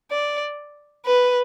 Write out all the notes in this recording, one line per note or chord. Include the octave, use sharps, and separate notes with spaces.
D5
B4